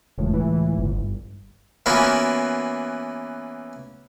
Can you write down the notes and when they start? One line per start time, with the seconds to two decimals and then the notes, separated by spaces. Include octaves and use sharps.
0.18 E1 C#2 A2
0.33 E3
0.78 G1
1.86 E3 A#3 B3 C#4 F4 F#4